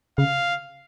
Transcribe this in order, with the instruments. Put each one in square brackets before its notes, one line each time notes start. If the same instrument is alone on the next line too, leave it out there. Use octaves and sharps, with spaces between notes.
[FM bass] C#3 [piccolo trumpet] F5